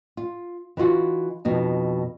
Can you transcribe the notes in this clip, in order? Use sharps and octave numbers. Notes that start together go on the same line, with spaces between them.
F4
E3 D#4 F4 F#4
F2 B2 D#4